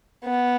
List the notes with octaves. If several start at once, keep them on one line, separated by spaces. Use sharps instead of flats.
B3